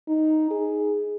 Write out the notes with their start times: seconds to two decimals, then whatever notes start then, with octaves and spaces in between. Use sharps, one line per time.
0.08 D#4
0.51 G#4